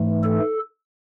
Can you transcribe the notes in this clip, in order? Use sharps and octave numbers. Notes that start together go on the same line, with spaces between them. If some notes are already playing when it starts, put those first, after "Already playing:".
Already playing: G#2 E3 A3
A4